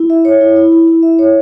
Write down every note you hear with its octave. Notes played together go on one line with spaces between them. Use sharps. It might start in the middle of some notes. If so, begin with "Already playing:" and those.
Already playing: E4
E5
C#5
E4
E4
E4
E4
E5
C#5